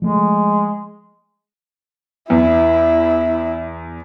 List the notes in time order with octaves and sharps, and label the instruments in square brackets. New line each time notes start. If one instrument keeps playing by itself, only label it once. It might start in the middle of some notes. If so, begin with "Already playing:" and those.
[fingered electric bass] F3 A3 [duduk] G#3
[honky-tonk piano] E2 [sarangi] E4